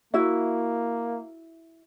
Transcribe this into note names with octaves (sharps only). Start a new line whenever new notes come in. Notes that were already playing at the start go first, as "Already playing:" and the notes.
A#3 E4 F#4 E5